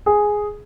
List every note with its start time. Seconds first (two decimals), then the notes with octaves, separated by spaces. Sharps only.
0.06 G#4